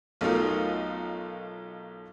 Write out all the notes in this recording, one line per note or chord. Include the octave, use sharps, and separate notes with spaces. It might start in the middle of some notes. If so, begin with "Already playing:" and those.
B1 A3 D#4 F4 A#4